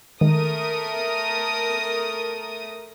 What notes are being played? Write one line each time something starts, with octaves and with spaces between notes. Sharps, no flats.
D#3 G#3 A3 A#4 D#6